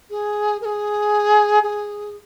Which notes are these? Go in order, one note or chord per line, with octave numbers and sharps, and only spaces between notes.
G#4
A#4
G#4
G#4